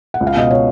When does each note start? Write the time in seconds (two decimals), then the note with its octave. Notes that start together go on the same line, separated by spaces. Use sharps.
0.14 F#5
0.21 C#2
0.27 F5
0.36 B2 D#5
0.51 C#5